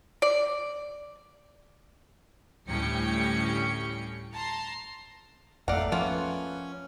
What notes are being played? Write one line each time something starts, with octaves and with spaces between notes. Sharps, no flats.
D5
D2 A2 G3 C#4 G5 C#7
A5 A#5 C6
G#1 F2 A3 D5 F5 F#5 A#5
F3 A#3 B3 C#4 F4